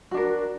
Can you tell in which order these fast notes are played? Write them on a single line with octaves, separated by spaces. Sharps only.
F#4 D4 A#4